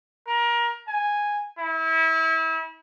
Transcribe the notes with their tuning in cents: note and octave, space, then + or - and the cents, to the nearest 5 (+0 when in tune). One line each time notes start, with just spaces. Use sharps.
A#4 +25
G#5 -5
E4 -30